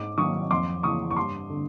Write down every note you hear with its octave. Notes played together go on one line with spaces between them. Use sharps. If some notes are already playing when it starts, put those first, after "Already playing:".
Already playing: G#2 D6
D#3 F#3 C#6 D#6
F2 C6 D6
C#3 E3 C#6 D#6
C#6
G2 C6 D6
D3